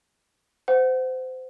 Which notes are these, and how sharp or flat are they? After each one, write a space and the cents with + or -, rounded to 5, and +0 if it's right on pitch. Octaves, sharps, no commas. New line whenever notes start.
C5 -25 F#5 +0